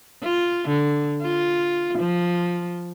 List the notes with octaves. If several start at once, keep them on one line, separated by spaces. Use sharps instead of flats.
F4
D3
F4
F3